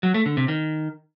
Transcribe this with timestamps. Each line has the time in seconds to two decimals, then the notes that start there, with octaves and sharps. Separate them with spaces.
0.03 F#3
0.14 A3
0.26 D3
0.37 C3
0.48 D#3